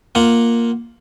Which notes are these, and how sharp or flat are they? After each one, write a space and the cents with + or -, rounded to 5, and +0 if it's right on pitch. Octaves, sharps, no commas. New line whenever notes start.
A#3 +0 F4 +0 F#5 +0